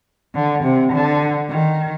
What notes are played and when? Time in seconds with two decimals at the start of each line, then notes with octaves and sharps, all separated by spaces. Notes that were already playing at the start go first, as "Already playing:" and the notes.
0.35 D3
0.63 C3
0.92 D3
1.50 D#3